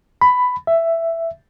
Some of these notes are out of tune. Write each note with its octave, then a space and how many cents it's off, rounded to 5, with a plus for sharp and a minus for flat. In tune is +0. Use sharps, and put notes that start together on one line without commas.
B5 +10
E5 +10